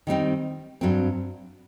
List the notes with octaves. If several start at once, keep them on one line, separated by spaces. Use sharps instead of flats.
D#3 G3 C4 D#4
G2 F#3 C4